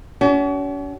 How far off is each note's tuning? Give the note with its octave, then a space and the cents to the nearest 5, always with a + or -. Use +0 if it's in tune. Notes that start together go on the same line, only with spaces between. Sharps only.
C#4 +40 F#4 +45